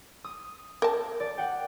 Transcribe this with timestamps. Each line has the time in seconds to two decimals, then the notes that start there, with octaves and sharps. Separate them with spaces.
0.24 D#6
0.82 A#4 A5
1.20 D5
1.38 F#5 G5